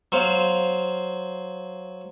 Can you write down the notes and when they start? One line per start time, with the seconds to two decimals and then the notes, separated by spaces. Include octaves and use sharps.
0.12 F#3 C5 F5